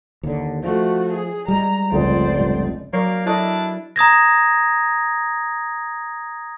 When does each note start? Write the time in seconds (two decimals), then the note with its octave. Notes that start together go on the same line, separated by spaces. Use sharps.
0.23 D#2 D3
0.63 F3 A3 F#4
1.14 G#4
1.48 G3 G#3 A#5
1.92 F1 C#2 C5 D5
2.39 G2 C3
2.93 F#3 A#3 A#4 C#5 D5
3.26 D4 E4 A4 C#5 D#5
3.96 A#5 D#6 G#6 A#6